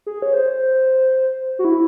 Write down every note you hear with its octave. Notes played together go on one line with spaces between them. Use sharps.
G#4
C#5
C5
F#4
E4